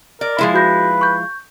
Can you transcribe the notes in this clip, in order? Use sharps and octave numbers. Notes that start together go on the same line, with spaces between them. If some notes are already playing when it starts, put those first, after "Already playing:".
A#4 D5
F3 G#3 E4
F#4 B4 G6 A#6
C#6 G6